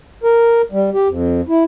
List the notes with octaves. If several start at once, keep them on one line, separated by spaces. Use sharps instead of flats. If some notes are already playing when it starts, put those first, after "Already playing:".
A#4
G3
G4
F2
E4